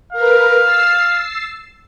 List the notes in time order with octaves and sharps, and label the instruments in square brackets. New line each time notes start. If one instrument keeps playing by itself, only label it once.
[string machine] A#4 B4 [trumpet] F5
[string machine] E6 A6 C7